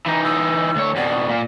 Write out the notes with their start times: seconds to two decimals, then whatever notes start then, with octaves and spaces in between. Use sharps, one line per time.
0.06 E3 D#4 A#5
0.24 E6
0.76 D2 C#5
0.96 F2 B2 D5
1.29 A#2